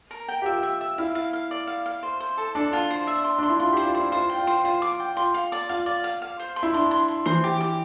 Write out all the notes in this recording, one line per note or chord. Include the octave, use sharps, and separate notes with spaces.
A#4
G5
G4
F4 E5
E5
E5
E4 F5
F5
F5
D5
F5
F5
C5
C5
A4
D4 A4
F4
C5
E5
C6
D4 C6
E4
F4 C6
G4 C5
F4
C5
E4
F4 C5
G5
F4
C5
F4 C5
D6
G5
F4 C6
F5
D5
F4 F5
D5
F5
F5
C5
C6
E4
D4 C6
C6
C6
E3 C5
G4
G4